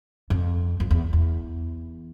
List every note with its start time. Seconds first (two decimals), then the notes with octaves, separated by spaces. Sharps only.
0.30 F2
0.80 F2
0.91 E2
1.13 E2